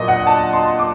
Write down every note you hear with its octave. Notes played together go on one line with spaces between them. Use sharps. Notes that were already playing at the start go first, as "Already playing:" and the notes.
Already playing: A#2 F#3 A#3 D4 D#5
F#5
A5
C6
D6